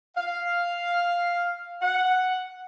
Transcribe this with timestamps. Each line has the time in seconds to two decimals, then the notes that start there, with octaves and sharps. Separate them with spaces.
0.17 F5
1.82 F#5